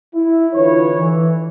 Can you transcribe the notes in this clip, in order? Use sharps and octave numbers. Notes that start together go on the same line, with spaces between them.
E4
D3 E3 D#4 F4 B4 C#5
E3